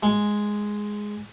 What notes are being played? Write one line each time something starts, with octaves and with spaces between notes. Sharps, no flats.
G#3